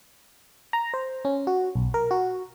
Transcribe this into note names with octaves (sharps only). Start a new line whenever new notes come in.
A#5
C5
C#4
F#4
B1
A#4
F#4